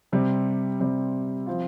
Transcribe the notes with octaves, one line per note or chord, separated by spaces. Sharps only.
C3 G3 C4
C3 G3 C4
F3 C4 F4